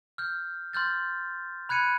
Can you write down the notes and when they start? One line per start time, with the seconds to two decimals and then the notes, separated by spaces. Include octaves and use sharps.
0.18 F6 G6
0.73 C6 F6 G6 A6
1.69 B5 F#6 G#6 C#7 D#7